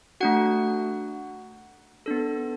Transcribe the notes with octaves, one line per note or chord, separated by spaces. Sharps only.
A3 D4 F#4 F#5
B3 D4 A4